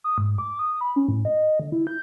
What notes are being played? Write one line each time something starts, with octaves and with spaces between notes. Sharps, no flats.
D#6
G#2
D6
D#6
B5
C#4
A2
D#5
D3
E4
G6